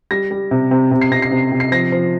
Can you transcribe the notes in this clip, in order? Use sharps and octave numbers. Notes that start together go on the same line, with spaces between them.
G3 A#6
G3
C3
C3
C3
C7
C3 A#6
C7
C3
C3
C7
F3 A#6
F3